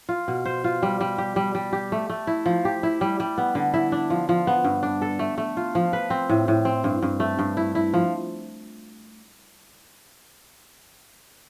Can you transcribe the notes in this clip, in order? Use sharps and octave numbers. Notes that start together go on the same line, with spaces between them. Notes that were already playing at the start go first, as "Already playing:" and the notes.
F4
B2
C5
F4
G3
G3
G4
G3
G3
G4
A3
A3
E4
F3
G4
E4
G3
G3
B3
D3
E4
D4
F3
F3
B3
G2
D4
A4
A3
A3
F4
F3
B4
C4
A2
A2
C4
G2
G2
A3
G2
E4
E4
F3